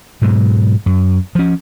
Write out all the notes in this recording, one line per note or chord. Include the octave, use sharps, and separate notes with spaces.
G#2 B2 F#3
F#2
F3 C#4